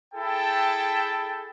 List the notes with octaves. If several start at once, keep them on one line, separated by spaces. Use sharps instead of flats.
E4 G#4 A4 G5 A5